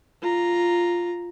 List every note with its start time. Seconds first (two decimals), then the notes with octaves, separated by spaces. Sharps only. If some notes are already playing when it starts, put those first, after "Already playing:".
0.22 F4 A#5